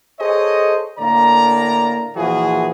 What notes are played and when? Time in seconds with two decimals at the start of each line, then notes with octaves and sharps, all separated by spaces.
0.20 G#4 A4 C5 C#5 D#5
0.99 A2 D3 A#3 D5 A#5
2.16 A#2 E3 F3 E4 F#4 G#4